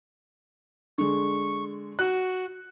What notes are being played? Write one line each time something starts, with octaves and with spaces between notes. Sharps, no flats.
D3 G#3 C#6
F#4 F#6